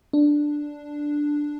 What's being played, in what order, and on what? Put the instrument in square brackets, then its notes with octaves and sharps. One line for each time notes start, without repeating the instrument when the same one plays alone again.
[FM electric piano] D4